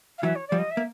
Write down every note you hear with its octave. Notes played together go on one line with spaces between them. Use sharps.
F5
E3 F#3 E5
C#5
F3 G3 D5
D#5
E5
A#3